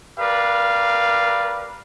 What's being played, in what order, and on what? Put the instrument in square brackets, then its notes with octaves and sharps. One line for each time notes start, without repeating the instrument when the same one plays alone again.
[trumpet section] G4 A#4 B4 D5 F5